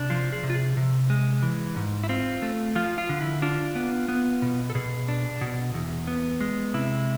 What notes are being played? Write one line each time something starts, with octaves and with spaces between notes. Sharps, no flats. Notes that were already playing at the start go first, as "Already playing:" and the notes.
Already playing: C3 D4
F3 F4
G#4
C3
F4
G#4
C3
G#3
E3
G#2
E4
C4 F4
A3
F3 F4
F4
D3
E4
D4 F4
B3
B3
B2
A4
B2 G#4
D4
B2
E2
B3
G#3
C3 E4